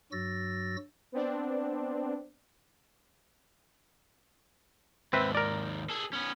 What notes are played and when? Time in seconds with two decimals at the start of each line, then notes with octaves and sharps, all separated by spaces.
0.12 G2 F#3 F#4 E6 A6 A#6
1.12 B3 C4 D4
5.13 D#2 G#2 C4 B4 E5
5.35 A#4 D5
5.90 G#4 A4
6.13 B3 C#4